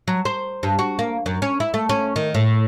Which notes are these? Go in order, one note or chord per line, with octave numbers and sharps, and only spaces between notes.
F#3
C5
G2
F#4
A#3
F#2
C#4
E4
A3
C#4
D#3
A2